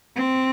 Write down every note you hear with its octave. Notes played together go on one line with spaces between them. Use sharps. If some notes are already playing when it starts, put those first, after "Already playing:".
C4